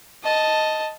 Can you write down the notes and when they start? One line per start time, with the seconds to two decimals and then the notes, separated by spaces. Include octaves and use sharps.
0.24 D#5 A5